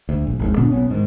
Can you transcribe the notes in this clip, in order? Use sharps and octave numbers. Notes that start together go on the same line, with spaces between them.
D2
A#1
G#1 D#2 G#2
A#2 D3 B3 D4
B1 B3 C#4
G#2 D#3